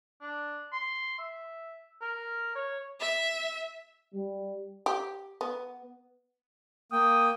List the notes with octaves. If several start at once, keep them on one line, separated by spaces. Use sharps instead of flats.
D4
C6
E5
A#4
C#5
E5
G3
G4
B3
A#3 G5 D#6